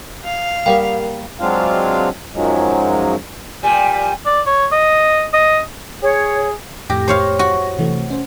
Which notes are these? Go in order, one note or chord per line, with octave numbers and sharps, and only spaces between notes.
F5
G3 A#3 A#4 F#5 G5
F#3 G#3 C4 D4 F4 F5
F#2 D#3 F3 F#3 G#3
A#2 G3 G#5
D5
C#5
D#5
D#5
G#4 C#5
F2 A2 G4 A#6
C5 C#5 F5
F#4
C3 E3 A3
C#4 C5